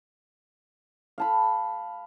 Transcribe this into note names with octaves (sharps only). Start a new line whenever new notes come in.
F5 A5 B5